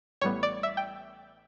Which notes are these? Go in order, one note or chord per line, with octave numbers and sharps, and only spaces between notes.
A1 A2 G3 B3 C#5
D5
E5
G5